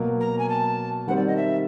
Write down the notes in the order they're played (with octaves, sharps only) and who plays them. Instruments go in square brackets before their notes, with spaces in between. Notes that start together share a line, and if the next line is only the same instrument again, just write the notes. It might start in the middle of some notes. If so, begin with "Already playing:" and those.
Already playing: [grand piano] B2 F#3 A#3
[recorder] A#5
G#5
A5
[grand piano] D#3 G3 C4 [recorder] F#5
[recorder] D5
D#5
E5